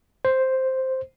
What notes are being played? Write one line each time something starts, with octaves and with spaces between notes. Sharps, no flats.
C5